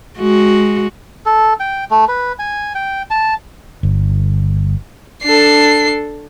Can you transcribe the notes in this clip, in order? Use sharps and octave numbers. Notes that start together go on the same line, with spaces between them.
G#3 F#4
A4
G5
A3
B4
G#5
G5
A5
G1
D4 A4 C7